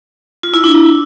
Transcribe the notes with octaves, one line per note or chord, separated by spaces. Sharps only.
F4
E4
D4